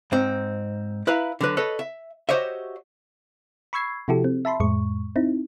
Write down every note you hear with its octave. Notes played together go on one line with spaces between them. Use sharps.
G#2 C4 D#4
E4 B4 F5 A#5
D3 F#3 B4
A4 B4 C#5 D#5
E5
F#4 G4 C5 C#5 D#5 E5
B5 C#6 E6 G#6 C7
C3 F3 E4 F#4 G4 A4
C4
E5 A5 B5 C6
F2 A2 G#3 C#6
C4 D#4 E4